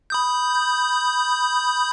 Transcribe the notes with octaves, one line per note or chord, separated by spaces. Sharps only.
B5 D#6 G6